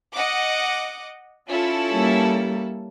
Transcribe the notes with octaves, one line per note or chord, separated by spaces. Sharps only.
D#5 F#5 D6
C#4 E4 F4 A4
G3 A#3